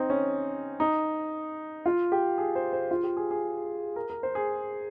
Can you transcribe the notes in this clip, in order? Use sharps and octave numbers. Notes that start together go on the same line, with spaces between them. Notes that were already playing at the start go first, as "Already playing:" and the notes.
Already playing: C4 D#4
C#4
D#4
F4
G4
G#4
C5
C5
F4
G4
G#4
G#4
A#4
A#4
C5
G#4